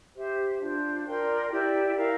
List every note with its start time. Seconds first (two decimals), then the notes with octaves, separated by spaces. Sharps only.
0.16 G4 C5 E5
0.61 D4 F4 C5
1.06 A#4 D5 G5 C6
1.51 E4 G4 D5 G5
1.96 E4 A#4 F5